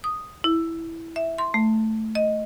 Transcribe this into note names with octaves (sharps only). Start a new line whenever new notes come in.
D#6
E4
E5
C6
A3
D#5